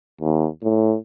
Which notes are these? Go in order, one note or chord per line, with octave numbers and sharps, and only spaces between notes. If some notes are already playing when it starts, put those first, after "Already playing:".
D#2
A2